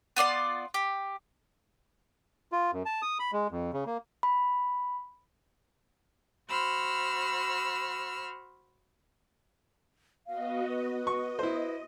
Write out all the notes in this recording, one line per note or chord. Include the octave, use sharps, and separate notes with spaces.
B3 F4 D5 C6
G4
F4
F#2
A5
D#6
B5
G#3
F2
C#3
A#3
B5
F#4 C5 B5 E6 F6
B3 F#4 D#5 F5
B4
D#5 C#6
E4 C5